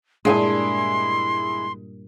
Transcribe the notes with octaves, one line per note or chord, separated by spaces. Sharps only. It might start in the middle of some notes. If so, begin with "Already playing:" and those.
G2 A#2 G#3 E4 G#4 G5 G#5 C6